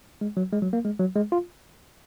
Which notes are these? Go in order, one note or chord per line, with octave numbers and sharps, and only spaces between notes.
G#3
F#3
G#3
F#3
A#3
G#3
F#3
G#3
F4